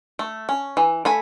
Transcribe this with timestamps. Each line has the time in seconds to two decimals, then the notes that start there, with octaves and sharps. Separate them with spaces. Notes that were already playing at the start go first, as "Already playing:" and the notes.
0.19 A3
0.49 C#4
0.77 E3
1.05 A3 G#5 B5